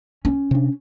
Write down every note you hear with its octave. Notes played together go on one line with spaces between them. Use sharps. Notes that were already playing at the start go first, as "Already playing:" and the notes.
C#4
C3 D4